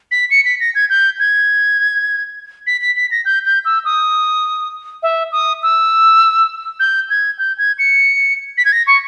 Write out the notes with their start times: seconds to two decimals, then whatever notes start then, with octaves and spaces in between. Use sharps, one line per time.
0.11 B6
0.31 C#7
0.45 B6
0.60 A#6
0.75 G#6
0.90 G6
1.20 G#6
2.67 B6
2.81 B6
2.96 B6
3.11 A#6
3.25 G6
3.45 G6
3.65 E6
3.85 D#6
5.03 E5
5.32 D#6
5.63 E6
6.80 G6
7.10 G#6
7.39 G6
7.58 G#6
7.79 C#7
8.58 B6
8.65 G#6
8.72 A#6
8.87 C#6